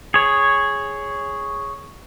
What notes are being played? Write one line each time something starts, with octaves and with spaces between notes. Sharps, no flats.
G#4 C#5